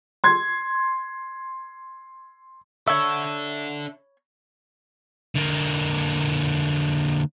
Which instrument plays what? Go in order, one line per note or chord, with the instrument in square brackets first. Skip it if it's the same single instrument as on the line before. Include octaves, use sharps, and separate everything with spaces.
[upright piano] C6 G#6
[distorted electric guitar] D4 A4 [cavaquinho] C#5 B5 C#6 [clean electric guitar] E5
[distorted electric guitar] D3 A#3